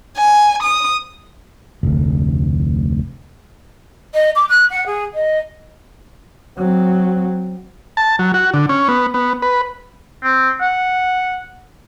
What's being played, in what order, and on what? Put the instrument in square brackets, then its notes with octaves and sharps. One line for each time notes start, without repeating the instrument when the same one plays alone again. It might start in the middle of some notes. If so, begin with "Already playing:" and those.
[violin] G#5
D#6
[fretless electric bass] F1 D2
[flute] D#5
D6
F#6
F#5
G#4
D#5
[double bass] F#3 C4
[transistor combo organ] A5
F#3
F#4
D3
C#4
B3
B3
B4
[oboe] C4
F#5